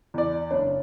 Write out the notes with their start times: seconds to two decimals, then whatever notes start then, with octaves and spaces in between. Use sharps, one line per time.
0.14 E2 D5
0.51 F#1 D4 C#5